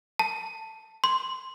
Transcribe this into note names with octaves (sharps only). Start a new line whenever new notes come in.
A5
C6